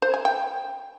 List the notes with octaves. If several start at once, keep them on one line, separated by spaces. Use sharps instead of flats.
C5
G#5
G5